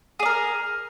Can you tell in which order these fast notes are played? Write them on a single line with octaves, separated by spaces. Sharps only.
G#4 D5 A#4